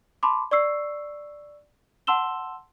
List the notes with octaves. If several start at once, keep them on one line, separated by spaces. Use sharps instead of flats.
A5 B5 C6 D6
D5 C#6 E6 C7
F#5 A5 C6 E6 E7 G7